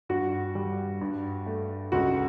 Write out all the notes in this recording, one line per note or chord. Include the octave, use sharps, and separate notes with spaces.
G2 F#4
G3
G2
A3
C#2 F#4